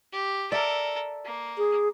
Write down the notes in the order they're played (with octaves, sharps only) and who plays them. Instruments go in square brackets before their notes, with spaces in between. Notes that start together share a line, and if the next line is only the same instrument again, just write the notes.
[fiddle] G4
[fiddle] A4 A#4 [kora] D5 E5
[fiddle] A#3
[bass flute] G#4